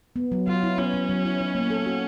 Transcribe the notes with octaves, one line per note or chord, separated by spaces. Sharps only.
B3
F#3
F#3 F4
E4
B3 C#4
F#3
F#3
E4
D#4
A#3
A4
F#4